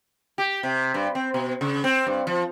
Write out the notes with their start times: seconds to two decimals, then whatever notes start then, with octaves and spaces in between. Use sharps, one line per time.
0.38 G4
0.63 C3
0.94 G2
1.15 C4
1.34 B2
1.61 C#3
1.84 C4
2.07 G2
2.27 F3